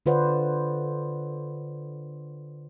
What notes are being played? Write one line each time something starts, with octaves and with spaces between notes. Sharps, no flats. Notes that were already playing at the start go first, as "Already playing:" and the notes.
D3 F4 B4 C5 D5 F#5